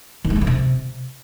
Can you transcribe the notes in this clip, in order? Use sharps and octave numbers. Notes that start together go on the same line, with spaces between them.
D#3
G#3
D3
F3
C3